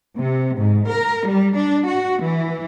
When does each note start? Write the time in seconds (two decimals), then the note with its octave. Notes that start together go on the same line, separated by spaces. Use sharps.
0.19 C3
0.57 G#2
0.88 A#4
1.27 G3
1.56 D4
1.87 F#4
2.23 E3